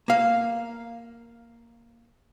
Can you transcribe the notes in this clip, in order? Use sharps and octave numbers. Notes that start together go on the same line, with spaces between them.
A#3 F5